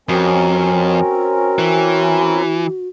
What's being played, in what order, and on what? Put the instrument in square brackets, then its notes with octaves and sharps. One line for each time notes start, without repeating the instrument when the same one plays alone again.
[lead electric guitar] F2 [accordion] C4 C#4 A#4 [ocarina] F#4
[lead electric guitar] E3